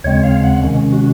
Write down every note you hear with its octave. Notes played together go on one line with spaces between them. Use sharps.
D#2 C#3 G#3 C4 C#5
F5
F#5
C3 D#3 G#3 C#4
F#4